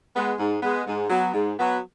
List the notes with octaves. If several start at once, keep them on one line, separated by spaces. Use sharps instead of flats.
G#3 B3
G#2
G#3 B3
G#2
F#3 B3
G#2
F#3 B3